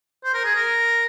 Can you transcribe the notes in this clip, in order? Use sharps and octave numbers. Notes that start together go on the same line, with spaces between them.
C5
A#4
G#4
A#4